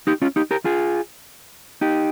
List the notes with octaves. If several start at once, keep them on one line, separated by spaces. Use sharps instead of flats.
D#4 G4
C#4 F4
D#4 G4
G4 A#4
F4 G#4
D#4 G4